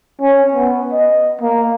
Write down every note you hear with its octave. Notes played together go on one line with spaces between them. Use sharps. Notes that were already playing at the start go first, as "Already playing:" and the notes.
C#4
B3
D#5
A#3